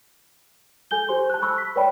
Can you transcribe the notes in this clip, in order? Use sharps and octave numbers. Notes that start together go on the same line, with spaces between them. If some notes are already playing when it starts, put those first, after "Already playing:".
A4 G#5 G6 G7
G4 C5 C6
A5 F#6
B5 C#6 E6 F#6
B6
B4 C#5 D5 G5 A5 B5